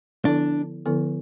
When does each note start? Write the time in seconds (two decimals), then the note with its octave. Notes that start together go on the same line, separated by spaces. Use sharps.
0.24 D3 F3 B3 D4 E4 A4
0.86 D3 F3 B3 E4 A4